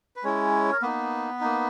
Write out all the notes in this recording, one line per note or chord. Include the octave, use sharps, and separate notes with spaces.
B4
G#3 C#4 E4 C#5
A#4
A#3 B3 D#4 B4
A#3 D#4